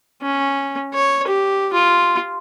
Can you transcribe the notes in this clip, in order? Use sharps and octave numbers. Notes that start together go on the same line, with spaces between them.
C#4
C#5
G4
F4